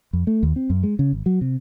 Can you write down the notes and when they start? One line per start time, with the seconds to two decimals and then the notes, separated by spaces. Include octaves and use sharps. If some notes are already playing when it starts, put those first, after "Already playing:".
0.13 F2
0.27 A3
0.43 D#2
0.56 C4
0.70 F#2
0.83 G#3
0.99 C#3
1.13 G#1
1.26 F#3
1.41 C3